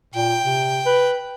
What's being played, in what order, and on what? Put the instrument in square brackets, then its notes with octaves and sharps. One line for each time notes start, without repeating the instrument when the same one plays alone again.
[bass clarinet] A#2 [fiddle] G5
[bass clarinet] C3
B4